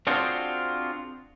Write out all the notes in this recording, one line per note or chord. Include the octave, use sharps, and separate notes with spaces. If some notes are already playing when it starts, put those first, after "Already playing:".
C4 D4 F4 F#4 G#4 C5